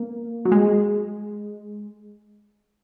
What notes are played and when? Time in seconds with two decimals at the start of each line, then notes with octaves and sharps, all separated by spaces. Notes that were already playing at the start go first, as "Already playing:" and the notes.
Already playing: A#3
0.45 F#3
0.52 G#3